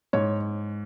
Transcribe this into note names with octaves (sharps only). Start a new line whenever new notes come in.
G#2 C#5